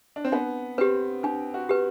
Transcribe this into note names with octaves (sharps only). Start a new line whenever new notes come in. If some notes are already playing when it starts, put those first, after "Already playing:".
D4
C4
B3 D4
C4 G4 B4
D4 G4
F#4
G4 B4